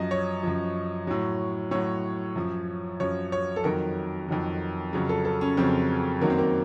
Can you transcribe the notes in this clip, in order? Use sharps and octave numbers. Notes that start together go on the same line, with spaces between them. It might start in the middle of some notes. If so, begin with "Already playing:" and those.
Already playing: F#2 F3 D#5
C#5
F#2 F3
A2 F#3
A2 F#3 C#5
F#2 F3
F#2 F3 C#5
C#5
A4
F2 D#3 F#3 A#4
F2 D#3 F#3
F2 C#3 F#3
A4
A4
C#4
F2 C#3 F#3 C4
F#2 D#3 F#3 A#3
C4
A#3